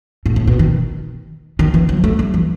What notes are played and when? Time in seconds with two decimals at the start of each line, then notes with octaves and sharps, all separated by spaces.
0.26 A2
0.36 A2
0.47 B2
0.59 D#3
1.59 D#3
1.74 E3
1.89 F#3
2.04 A3
2.19 G3
2.34 E3